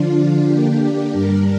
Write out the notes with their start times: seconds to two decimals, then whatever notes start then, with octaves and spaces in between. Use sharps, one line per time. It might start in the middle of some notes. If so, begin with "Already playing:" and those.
Already playing: D3 F3 D4 F4
0.44 D3 A#3 D4 G4
1.10 G2 G3 D4 A#4